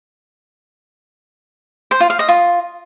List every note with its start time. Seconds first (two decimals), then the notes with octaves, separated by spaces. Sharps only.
1.91 C5
2.00 F4
2.10 F5
2.19 D#5
2.28 F4